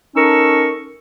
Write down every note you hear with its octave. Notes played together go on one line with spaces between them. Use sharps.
C#4 D#4 A4 A#4 C#6 E6